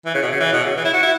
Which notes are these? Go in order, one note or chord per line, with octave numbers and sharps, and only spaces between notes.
E3
C#3
B2
C#3
E3
B2
C#3
E3
E4
F#4
E4